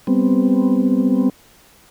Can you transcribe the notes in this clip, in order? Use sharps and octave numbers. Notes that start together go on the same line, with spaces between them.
G3 B3 C4